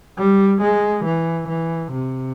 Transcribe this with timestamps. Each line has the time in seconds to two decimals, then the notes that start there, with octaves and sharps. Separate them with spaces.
0.18 G3
0.61 G#3
1.04 E3
1.48 E3
1.92 C3